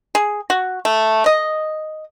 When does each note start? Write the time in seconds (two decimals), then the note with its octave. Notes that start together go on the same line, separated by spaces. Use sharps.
0.15 G#4
0.50 F#4
0.85 A3
1.26 D#5